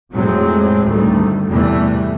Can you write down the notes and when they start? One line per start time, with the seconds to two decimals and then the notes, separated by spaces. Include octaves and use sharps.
0.12 F2 A2 F#3 G#3 C4
0.85 D2 G2 D#3 G3 A3
1.47 E2 A2 C3 E3 G3 A3